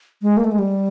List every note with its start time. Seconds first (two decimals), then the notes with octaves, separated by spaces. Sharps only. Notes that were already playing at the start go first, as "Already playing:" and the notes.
0.22 G#3
0.37 A#3
0.44 A3
0.52 G#3
0.59 G3